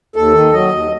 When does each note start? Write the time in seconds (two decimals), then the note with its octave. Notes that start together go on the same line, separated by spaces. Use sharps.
0.16 D#2 A4
0.34 D#3
0.53 F#3 D#5
0.71 D#2